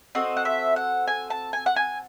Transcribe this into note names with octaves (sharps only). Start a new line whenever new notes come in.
C4 F#4 A4 D#5
F#5
E5
F#5
G#5
A5
G#5
F#5
G#5